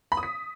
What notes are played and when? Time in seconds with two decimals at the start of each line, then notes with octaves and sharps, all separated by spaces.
0.12 B5
0.17 D#6
0.23 B6